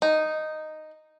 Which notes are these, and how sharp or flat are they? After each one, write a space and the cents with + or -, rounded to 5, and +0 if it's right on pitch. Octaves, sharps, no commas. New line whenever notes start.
D#4 -5